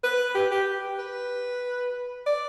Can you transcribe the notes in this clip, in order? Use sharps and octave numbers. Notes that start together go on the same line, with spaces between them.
B4
G4
G4
B4
D5